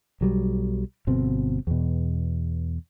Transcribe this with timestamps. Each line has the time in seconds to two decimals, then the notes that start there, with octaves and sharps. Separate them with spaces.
0.21 B1 F#3 G3
1.07 G1 B2 C4
1.67 E2 B2